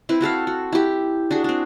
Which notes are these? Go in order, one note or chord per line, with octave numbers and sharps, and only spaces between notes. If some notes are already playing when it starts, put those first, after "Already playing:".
C4 E4 B4
C4 F#4 A4 F5
F#4
E4 G4
D4 F#4 G#4
C4 D4